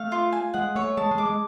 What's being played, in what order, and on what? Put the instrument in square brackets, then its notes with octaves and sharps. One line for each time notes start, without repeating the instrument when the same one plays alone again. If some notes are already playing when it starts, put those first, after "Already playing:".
Already playing: [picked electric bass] A3 [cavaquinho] F5
[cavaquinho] F4
G#5
[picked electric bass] G#3 [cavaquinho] F#5
[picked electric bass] A3 [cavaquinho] C#5
[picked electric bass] G#3 [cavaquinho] A5
[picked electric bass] G#3
[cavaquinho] D6
[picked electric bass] G#3